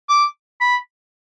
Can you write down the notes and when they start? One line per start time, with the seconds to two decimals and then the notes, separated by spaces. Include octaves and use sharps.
0.09 D6
0.61 B5